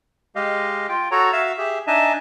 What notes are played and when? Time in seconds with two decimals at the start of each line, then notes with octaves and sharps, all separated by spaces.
0.36 G#3 G4 D#5 F5
0.89 F4 G5
1.11 F#4 A4 C#5 A#5
1.32 F#4 E5 F5 E6
1.58 G4 G#4 E5
1.87 D4 D#4 D#5 E5 G#5 A5